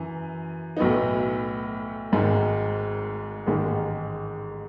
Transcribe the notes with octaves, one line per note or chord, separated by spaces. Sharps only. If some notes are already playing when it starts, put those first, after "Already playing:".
Already playing: F#2 E3
B1 A2 F#3 B3 D#4
G#1 G#2 D#3 G#3
A1 G#2 D#3 G#3